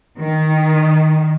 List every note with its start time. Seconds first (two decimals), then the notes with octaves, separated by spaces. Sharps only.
0.18 D#3